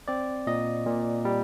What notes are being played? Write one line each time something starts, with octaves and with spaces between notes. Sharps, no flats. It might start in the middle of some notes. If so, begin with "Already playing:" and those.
C4 D5
A#2 D#5
A#2
G3